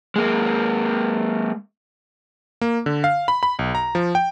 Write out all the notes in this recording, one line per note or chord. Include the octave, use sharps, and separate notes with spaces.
G#3 A#3
A#3
D3
F5
B5
B5
B1
A#5
F3
G5